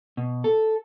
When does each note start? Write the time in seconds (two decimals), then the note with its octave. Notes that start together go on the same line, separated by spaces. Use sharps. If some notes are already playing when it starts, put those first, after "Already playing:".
0.17 B2
0.44 A4